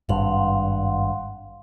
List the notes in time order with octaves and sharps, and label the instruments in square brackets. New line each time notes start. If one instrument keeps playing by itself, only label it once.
[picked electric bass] G#1 G2 [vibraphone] F5 F#5 C6